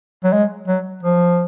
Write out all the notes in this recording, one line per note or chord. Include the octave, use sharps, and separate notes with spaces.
F#3
G#3
F#3
F3